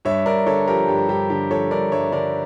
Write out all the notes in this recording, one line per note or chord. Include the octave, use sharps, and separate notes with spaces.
G2 C#5 E5
G2 A#4 D5
D3 A4 C#5
F3 G4 A#4
G2 G4
G2 G4
D3 G4
F3 A4 C#5
G2 A#4 D5
G2 C#5 E5
D3 A#4 D5